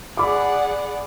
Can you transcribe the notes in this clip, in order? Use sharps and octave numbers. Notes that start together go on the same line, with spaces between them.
G#4 D5 F#5 B5 D6